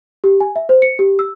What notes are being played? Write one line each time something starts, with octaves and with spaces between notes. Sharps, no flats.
G4
G#5
E5
C5
C#7
G4
E6